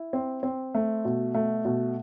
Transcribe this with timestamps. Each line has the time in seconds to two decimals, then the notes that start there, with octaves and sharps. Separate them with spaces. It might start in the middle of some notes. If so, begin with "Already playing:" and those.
Already playing: E4
0.13 C4
0.43 C4
0.75 A3
1.05 B2
1.34 A3
1.65 B2